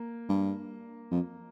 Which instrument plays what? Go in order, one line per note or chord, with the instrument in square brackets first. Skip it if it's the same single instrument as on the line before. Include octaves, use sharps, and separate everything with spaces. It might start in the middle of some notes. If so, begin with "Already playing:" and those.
Already playing: [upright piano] A#3
[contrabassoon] G2
F2